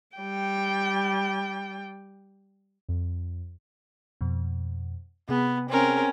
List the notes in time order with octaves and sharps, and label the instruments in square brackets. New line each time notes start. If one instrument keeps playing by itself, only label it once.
[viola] G3 G5
[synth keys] F2
[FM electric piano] F2 B2
[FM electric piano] C3 G#4 [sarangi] B3
[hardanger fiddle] C4 A#4 [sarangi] C#4